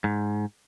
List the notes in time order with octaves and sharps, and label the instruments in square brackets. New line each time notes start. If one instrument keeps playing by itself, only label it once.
[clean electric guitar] G#2